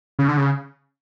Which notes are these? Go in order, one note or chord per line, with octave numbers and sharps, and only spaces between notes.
C#3
D3
C#3